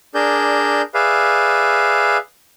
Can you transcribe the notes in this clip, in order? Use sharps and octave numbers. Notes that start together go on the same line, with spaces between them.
D4 G#4 A#4 D5 G6
G#4 B4 D5 E5 F5